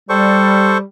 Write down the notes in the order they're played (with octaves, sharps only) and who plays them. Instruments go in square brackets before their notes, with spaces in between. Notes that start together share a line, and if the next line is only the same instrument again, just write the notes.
[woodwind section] G3 [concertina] A4 C5 C#6